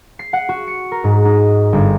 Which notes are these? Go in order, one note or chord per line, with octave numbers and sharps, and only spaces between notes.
C7
F#5
F#4
C#7
A#4
G#2
D#4
G1